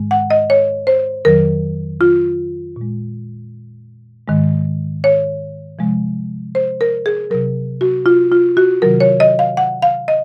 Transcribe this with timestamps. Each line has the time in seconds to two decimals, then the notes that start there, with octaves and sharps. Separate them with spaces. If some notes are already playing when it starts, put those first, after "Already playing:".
Already playing: G#2 D#3 G#3
0.11 F#5
0.30 D#5
0.50 C#5
0.87 C5
1.25 F2 D#3 F#3 A#4
2.01 F4
2.76 A#2 G#3
4.28 G#2 D#3 G#3
5.04 C#5
5.79 C3 F3 G#3
6.55 C5
6.81 A#4
7.06 G#4
7.30 C3 F#3 A#4
7.81 F#4
8.06 F4
8.32 F4
8.57 F#4
8.82 C3 D#3 F#3 A#4
9.00 C#5
9.20 D#5
9.39 F5
9.57 F#5
9.82 F5
10.08 D#5